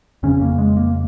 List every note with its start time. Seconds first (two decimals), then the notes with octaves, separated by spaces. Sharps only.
0.23 F2 C#3 C#4
0.41 A#3
0.58 G#3
0.77 A#3